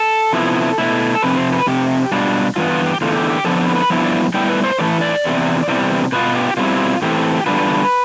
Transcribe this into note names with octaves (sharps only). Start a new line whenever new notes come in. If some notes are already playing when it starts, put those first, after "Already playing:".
Already playing: A4
C3 F3 B3 E4
B2 A3 E4
A4
F2 C3 F3 B4
C5
B4
F2 C3 G4
B2 G3 D4 F4
G2 E3 B3 F4
F4
G4
E2 D3 A3 F4
G4
G4
F2 D3 F3 B3 A4
B4
B4
G2 F3 B3 E4
D5
A2 G3 B3 E4 G5
B4
C5
A2 E3 A3 D5
D5
E2 C3 E3
E2 C3 E3 G3
B2 B3 F4 B4
G4
B2 G3 C4 E4 F4
A2 E3 A3 C4 G4
E2 D3 G3 D4 F4 B4